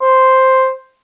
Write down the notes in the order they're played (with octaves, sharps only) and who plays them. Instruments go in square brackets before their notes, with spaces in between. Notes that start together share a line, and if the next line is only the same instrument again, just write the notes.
[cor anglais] C5